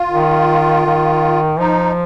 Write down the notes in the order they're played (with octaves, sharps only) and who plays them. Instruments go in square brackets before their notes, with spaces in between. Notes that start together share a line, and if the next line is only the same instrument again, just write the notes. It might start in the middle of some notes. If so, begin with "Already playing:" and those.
Already playing: [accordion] F4
[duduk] D#3
D#3
[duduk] F3 [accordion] D#4